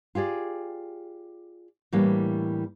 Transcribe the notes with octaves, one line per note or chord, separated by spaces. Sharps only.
F4 G4 G#4 D5
A2 E3 G3 A#3 D4